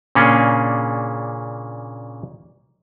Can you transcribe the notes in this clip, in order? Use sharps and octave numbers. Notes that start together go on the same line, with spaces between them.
A#2 C#3 A#3 C#4 D4 G#4